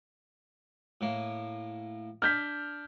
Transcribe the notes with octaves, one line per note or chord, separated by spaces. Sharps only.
A2 A#3
D4 F6 G6 B6